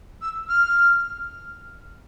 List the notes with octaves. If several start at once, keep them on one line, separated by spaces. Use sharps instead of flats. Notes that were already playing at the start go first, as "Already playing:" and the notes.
E6
F6